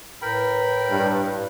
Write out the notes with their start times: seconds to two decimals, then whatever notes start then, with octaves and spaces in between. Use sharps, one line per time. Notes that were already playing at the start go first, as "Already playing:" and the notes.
0.22 A2 A#4 B4 G5 B5
0.91 G2